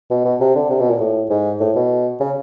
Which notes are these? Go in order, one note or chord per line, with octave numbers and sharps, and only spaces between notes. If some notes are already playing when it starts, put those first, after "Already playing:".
B2
B2
C3
D3
C3
B2
A#2
A2
G#2
A2
B2
C#3